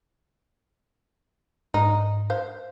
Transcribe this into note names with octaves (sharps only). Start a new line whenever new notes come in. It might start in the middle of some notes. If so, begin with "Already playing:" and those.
G#2 D#4
C5 F5